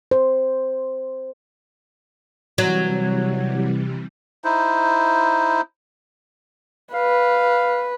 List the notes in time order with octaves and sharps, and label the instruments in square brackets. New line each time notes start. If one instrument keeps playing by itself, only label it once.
[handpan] C5
[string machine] C3 E3 G3 [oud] F#3
[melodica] D#4 E4 C5
[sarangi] B4 [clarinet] F5